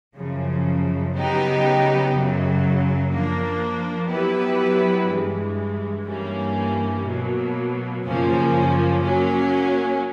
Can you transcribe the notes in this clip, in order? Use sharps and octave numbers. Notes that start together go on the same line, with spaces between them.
F#2 C#3 F3
C#3 F#3 B3 D#4 G4
F#2 C#3 F#3
F3 A#3 D4
F#3 B3 E4 G4 B4
G2 E3 G#3
G2 E3 G3 A#3 C#4
B2 F#3 A#3
F#2 C#3 F3 A#3 C#4
F#3 A#3 C#4